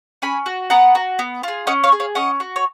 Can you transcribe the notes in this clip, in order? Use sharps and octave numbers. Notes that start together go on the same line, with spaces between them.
C#4 G#5 B5
F#4
B3 F#5 A#5
F#4
B3
F4 G#4
C#4 D#5 F#5
C#5 F5
G#4
C#5 F5
C#4 D#5 F#5
F#4
C#5